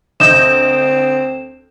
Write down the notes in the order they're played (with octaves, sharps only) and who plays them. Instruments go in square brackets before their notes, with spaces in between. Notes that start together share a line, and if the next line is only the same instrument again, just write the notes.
[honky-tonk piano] D2 D#5 G6 [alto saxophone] C4 [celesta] E7